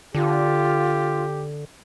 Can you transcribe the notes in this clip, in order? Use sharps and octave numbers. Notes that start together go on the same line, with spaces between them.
D3 F4 G4